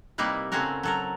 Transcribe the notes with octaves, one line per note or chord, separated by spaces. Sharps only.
C3 G3 A#3 D#4 E4 B4
C#3 A3 C4 C#4 F#4 A#4
F#3 A4 A#4